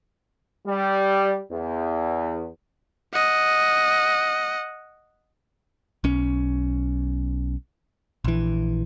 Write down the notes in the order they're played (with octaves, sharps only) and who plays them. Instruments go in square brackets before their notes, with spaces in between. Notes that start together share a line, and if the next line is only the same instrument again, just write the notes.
[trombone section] G3
E2
[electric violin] D#5 F#5
[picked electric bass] B1 C#4
A#1 E3